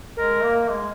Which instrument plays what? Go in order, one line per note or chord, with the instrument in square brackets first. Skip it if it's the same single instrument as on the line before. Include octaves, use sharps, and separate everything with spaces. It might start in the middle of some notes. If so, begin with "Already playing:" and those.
[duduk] G#3 [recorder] A#4
[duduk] A#3
G#3